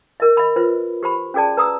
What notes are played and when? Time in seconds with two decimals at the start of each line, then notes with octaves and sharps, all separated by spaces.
0.20 A#4 D#5
0.37 D#5 B5
0.56 F4 B4 C5
1.03 G4 C5 B5
1.34 C#4 F#4 G#4 D5 A5
1.57 B4 A#5 D#6 E6